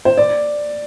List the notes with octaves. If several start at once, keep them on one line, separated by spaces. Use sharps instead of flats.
C5
D5